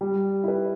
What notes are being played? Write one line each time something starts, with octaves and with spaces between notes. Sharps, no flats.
G3
E4 B4